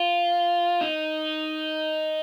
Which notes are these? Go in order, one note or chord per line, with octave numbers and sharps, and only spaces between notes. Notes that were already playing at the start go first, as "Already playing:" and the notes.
Already playing: F4
D#4